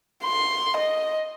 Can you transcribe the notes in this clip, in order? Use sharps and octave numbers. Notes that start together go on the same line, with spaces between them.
C6
D#5